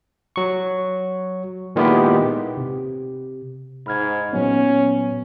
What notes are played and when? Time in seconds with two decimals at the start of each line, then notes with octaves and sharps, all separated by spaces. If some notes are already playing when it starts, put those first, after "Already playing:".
0.36 F#3 C#6
1.76 A#2 D#3 G#3 B3 E4 G4
2.57 C3
3.87 G#2 B5 F6 G#6
4.33 A#2 F#3 B3 C#4